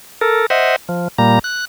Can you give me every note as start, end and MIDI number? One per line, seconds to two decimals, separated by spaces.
0.21 0.46 69
0.21 0.46 70
0.50 0.76 72
0.50 0.76 75
0.50 0.76 76
0.50 0.76 78
0.89 1.08 53
1.18 1.39 46
1.18 1.39 55
1.18 1.39 58
1.18 1.39 82
1.44 1.65 90